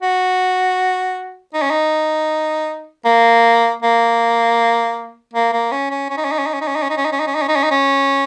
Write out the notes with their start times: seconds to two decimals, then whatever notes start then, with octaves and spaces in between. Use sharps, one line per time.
0.02 F#4
1.54 D#4
1.62 C#4
1.70 D#4
3.05 A#3
3.82 A#3
5.34 A#3
5.53 A#3
5.72 C#4
5.90 C#4
6.10 C#4
6.17 D#4
6.25 C#4
6.32 D#4
6.39 C#4
6.46 D#4
6.53 C#4
6.61 D#4
6.68 C#4
6.75 D#4
6.83 C#4
6.90 D#4
6.97 C#4
7.05 D#4
7.12 C#4
7.19 D#4
7.27 C#4
7.34 D#4
7.42 C#4
7.48 D#4
7.56 C#4
7.63 D#4
7.71 C#4